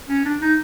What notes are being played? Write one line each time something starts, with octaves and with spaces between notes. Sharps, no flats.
C#4
D4
D#4